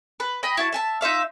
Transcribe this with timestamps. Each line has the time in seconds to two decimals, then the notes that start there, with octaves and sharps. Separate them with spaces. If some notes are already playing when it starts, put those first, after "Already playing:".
0.20 B4
0.43 D#5 G5 B5
0.57 E4 F#4 A5
0.72 E5 G#5 A5
1.01 D#4 F4 E5 F5